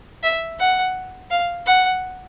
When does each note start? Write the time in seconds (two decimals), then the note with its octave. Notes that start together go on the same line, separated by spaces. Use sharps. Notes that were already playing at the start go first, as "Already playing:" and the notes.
0.23 E5
0.59 F#5
1.30 F5
1.66 F#5